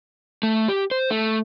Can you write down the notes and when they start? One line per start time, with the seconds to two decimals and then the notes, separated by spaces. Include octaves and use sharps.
0.43 A3
0.68 G4
0.91 C5
1.10 A3